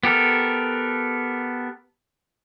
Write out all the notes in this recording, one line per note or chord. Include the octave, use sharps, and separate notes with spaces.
B3 G4 A4 A#4